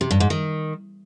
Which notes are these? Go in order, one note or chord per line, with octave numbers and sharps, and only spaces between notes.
C3
G2
G#2
D#3